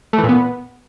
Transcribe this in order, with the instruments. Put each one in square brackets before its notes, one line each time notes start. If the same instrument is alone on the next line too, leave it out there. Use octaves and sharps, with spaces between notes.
[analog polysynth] A3
E3
A#2
B3